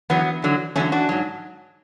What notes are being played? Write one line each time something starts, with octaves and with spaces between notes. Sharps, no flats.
E2 D3 F#3 B3
E2 D3 F#3
E2 D3 F#3 A3 C#4
D4 F#4
G#2 F#3